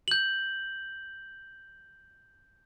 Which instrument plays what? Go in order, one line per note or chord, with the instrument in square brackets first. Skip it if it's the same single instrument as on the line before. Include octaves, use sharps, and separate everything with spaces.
[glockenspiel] G6 F#7